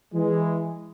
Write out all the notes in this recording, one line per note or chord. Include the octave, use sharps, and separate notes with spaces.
E3 G#3